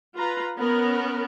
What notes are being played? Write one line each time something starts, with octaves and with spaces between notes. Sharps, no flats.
F4 B4 A#5
B3 C#4 A#4